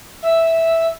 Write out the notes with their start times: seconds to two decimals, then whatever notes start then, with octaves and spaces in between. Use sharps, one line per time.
0.23 E5